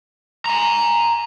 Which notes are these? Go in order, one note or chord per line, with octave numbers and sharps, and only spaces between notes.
G#5 A#5